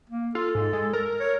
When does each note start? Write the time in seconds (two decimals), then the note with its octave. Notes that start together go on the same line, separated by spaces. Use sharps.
0.09 A#3
0.35 F4 A4
0.55 G#2
0.73 G#3
0.93 A#4
1.20 C#5